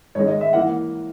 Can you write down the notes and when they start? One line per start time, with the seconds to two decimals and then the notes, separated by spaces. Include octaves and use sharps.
0.15 G#2 D#3 G#3 C#5
0.28 D#5
0.41 E5
0.53 E3 A#3 F#5